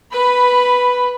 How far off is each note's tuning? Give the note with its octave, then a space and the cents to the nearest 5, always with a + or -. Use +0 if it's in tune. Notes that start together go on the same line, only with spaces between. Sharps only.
B4 +0 B5 +10